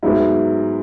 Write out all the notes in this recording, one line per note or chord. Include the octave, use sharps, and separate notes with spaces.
G#2 F#3 B3 E4